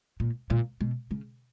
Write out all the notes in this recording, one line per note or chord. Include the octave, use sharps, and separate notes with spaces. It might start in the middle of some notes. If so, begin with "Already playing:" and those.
A#2
A#2
B2
C#3